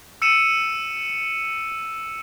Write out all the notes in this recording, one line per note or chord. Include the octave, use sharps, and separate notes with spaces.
E6 C#7 D#7 E7